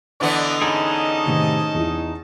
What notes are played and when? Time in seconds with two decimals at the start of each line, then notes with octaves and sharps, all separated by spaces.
0.21 D3 E3 B3 D5 D#5
0.62 C#4 D#4 G#4 D#5 A5 B5 D7
1.26 A2 C3 D#3
1.74 E2 E4